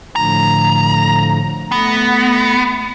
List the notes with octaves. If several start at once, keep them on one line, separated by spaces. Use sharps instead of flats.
A2 D3 F3 A#5
A3 B3 A#6